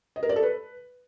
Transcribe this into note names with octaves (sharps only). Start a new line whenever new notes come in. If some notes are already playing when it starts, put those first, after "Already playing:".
D#5
A#4
D5
A4
B4